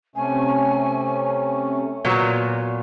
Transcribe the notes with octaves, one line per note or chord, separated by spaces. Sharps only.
C3 A3 C#4 G#5
A#2 F#3 B3 D5